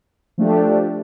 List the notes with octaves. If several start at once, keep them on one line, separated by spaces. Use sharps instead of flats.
F3 A3 D4 G4